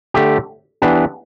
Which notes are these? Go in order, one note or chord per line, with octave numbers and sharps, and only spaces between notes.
D3 A3 G4
E3 B3 D4 G4